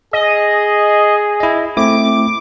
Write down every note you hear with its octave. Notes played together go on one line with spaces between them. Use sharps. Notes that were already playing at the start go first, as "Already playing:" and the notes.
G#4 D#5
E4 D#5
A3 C4 E4 D6